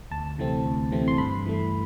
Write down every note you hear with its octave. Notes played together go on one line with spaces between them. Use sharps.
D2 A5
C3 E3 A3 C4
D2
C3 E3 A3 C4
C6
G2 B5
E3 A3